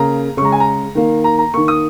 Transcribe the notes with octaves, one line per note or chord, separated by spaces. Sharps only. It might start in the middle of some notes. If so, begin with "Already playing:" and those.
Already playing: C#3 A#3 A#5
C#3 G#3 A#5 C#6
G#5
A#5
D#3 A#3
A#5
A#5
D#3 A#3 C#6
D#6